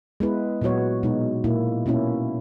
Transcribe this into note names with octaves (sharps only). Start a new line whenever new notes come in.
G#3 B3 E4 B4
A#2 F#3 B3 F#4 C#5
B2 G#3 D#4
A#2 A#3 E4
B2 A#3 C#4 E4